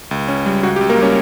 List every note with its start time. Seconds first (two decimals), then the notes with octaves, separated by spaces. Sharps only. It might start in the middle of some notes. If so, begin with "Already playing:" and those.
0.11 C#2
0.28 C#4
0.46 G3
0.63 C#2 F#4
0.76 G4
0.81 C#2
0.89 A#3 A#4
0.98 G3 C#4 C#5